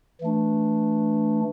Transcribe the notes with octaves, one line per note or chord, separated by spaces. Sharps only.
E3 A3 D4